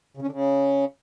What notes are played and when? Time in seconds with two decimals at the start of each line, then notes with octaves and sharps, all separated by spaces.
0.17 C#3
0.22 C#4
0.27 D3
0.32 C#3